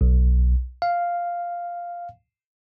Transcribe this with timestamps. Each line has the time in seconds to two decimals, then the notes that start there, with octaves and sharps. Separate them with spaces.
0.01 B1
0.82 F5